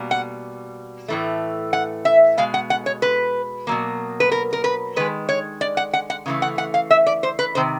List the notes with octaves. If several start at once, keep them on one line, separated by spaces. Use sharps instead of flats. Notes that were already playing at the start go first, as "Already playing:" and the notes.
Already playing: B2 G3 A#3
F#5
A2 E3 A3
F#5
E5
B2 G#3 F5
F#5
F#5
C#5
B4
B2 F#3 A#3
B4
A#4
A#4
B4
D#3 G#3 B4
C#5
D5
F#5
F#5
F#5
C#3 E3 A3
F#5
F#5
F5
E5
D5
C5
B4
C3 D#3 C5